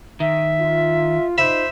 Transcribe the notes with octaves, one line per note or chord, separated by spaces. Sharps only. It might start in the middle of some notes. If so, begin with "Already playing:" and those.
D#3 E5
F4
D#4 F4 C5 E5 B5